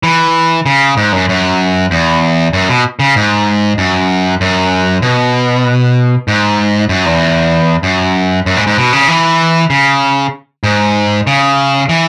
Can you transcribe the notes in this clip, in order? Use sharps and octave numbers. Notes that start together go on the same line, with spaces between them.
E3
C#3
G#2
F#2
F#2
E2
F#2
B2
C#3
G#2
F#2
F#2
B2
G#2
F#2
E2
F#2
F#2
G#2
G#2
B2
C#3
E3
C#3
G#2
C#3
E3